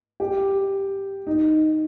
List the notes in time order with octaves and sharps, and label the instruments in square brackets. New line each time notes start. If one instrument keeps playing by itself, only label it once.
[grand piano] G4
D#4